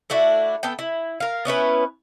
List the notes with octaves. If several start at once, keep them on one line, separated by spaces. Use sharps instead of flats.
A3 D4 E4 F#4
B3 A4 G5
E4
A#4 F5
B3 C#4 E4 B4